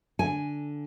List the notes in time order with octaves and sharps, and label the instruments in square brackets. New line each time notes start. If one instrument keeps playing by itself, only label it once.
[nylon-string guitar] D3 G#5